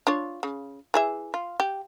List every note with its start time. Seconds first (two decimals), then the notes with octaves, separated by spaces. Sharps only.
0.07 D4 F4 C#5
0.43 C#3
0.94 E3 G#4 E5
1.34 F4
1.60 G4